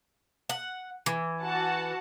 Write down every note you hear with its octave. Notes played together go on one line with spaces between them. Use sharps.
F#5
E3
F#4 F#5 A5